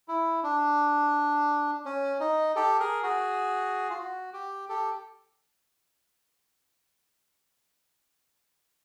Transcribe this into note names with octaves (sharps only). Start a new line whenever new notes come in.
E4
D4
C#4
D#4
G4 A4
G#4 A#4
F#4 G#4
F4
F#4
G4
G4 A4